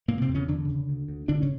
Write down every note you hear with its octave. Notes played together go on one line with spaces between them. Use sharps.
A#2 C#3 A#3
C3 C4
E2
C#3 C#4
E2 D3 D4
C#3
D2
D2
D2 D3 D4
C#3 C#4